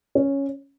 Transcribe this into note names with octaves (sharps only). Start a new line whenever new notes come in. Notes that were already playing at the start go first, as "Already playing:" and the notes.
C#4